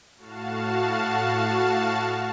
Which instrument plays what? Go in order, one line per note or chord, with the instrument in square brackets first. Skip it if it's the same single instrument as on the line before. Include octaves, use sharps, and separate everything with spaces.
[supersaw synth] A2 F#4 F5 A5